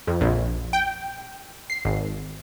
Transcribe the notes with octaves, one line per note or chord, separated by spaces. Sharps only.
F2
A#1
G5
C7
G#1